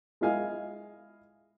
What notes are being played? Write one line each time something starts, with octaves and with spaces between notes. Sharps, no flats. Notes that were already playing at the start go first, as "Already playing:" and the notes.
G#3 E4 F4 D#5 F5 G#5